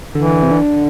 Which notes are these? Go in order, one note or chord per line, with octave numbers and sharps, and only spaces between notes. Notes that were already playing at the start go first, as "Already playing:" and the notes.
D3 E3
C3
D3